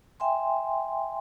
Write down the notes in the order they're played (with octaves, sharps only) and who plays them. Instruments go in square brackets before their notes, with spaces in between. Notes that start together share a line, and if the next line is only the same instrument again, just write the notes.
[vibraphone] E5 G5 G#5 C6